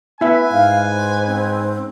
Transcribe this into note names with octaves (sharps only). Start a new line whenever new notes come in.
B3 E4 B4 E5 G#5
G#2 F5
C5
C4